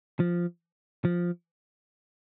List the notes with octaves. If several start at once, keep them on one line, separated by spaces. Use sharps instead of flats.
F3
F3